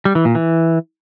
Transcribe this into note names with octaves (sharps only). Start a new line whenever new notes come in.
G3
E3
A#2
E3